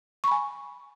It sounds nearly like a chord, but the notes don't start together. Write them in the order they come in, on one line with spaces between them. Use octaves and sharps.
C#6 B5 G#5